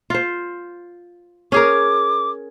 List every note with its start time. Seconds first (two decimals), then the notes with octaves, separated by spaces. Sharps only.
0.10 F4 C5
1.52 C#4 G#4 A#4 D6